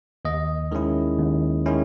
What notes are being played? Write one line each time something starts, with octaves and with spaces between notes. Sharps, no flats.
D#2 D#5
D#3 G#3 C#4 E4
D#2
D#3 G#3 C#4 E4